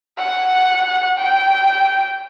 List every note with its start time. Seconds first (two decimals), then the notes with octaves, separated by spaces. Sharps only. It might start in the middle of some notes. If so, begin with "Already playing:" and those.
0.18 F#5
1.17 G5